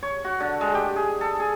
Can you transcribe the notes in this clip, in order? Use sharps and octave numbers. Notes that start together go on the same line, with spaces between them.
C#5
F#4
D3
G#3
G4
G#4
A4
G#4